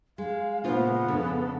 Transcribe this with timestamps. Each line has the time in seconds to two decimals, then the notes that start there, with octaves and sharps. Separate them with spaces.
0.18 G#3 F5
0.64 A#2 C#3 G#3 B3 F4 C5
1.08 F2 C#3 D4 A4